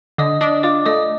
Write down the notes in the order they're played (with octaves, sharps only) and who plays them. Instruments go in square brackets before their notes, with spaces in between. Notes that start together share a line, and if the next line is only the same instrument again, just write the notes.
[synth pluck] D3 [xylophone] D#5 D#6
[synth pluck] D4 [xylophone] D#5 D#6
[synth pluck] F4 [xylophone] D5 D6
[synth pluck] A3 [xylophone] D#5 D#6